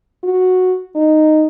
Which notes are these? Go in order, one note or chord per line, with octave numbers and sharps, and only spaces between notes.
F#4
D#4